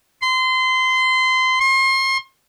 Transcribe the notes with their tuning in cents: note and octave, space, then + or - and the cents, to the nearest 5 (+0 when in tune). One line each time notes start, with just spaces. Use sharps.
C6 -25
C6 +35